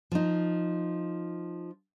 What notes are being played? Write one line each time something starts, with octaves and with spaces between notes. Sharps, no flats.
F3 D#4